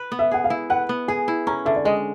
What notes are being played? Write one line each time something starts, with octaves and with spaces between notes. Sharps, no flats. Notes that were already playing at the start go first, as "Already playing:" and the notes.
Already playing: B4
B3
E5
G#4 F#5
F5
E4
B4 F#5
B3
G#4 G#5
E4
C#4 A#5
D3 E5
D5
G#3 D#5